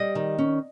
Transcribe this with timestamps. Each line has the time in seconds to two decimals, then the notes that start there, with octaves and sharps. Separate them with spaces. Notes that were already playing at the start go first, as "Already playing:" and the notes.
Already playing: G3 D#5
0.15 D#3
0.38 C#4